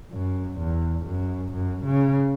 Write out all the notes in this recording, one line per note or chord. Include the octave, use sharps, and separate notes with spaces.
F#2
E2
F#2
F#2
C#3